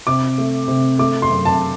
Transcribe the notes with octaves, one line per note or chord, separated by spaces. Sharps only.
C3 D6
A3
C3
A3 D6
C6
F#2
A5